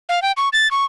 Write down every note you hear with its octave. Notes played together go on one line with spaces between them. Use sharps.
F5
G5
C#6
A6
C#6